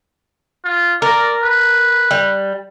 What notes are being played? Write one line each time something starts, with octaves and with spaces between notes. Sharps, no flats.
F4
A#4 D5
B4
G3